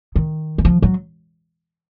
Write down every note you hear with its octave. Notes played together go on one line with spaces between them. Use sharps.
D#3
E3
F3
F#3